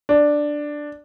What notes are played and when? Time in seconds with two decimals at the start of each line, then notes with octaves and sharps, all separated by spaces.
0.09 D4